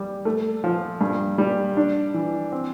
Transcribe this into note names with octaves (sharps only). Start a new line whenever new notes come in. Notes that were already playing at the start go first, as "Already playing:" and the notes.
Already playing: G3
A3
F3
G2
G3
D4
E3
C4